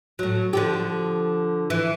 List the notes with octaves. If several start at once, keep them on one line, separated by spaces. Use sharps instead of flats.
A2 F#3
D3 F3 G4
E3